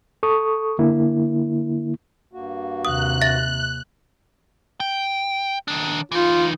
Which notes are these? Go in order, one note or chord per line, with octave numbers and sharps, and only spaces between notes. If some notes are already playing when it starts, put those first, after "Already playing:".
A4 C#6 D#6
D3 A#3 E4
G2 A#3 F#4
D#2 C3 D#6 F#6
E5 A6 A#6
G5
D#3 D4
E3 D#4 F4